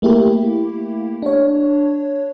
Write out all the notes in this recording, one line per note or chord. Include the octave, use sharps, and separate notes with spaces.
A3 A#3 E4 G4
D4 C#5